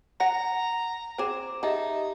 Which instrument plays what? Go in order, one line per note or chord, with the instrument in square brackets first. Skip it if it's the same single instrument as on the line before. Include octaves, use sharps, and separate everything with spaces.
[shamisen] F#5 [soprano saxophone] A#5 [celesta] A#6
[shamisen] C4 G#4 [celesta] C5 D6 E7
[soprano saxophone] D#4 [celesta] G4 D#5 E5 [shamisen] G#4 A5